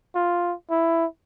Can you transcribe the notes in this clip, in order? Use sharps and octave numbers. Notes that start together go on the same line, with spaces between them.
F4
E4